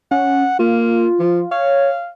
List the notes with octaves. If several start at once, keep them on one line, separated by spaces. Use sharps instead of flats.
C#4 F#5
A#3 F4
F3
C#5 F5